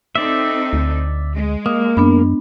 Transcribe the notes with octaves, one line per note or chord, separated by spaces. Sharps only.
C4 D#4 A4 D5 E5
D2
G#3
A#3 D#6
F#2 B3 D4 B5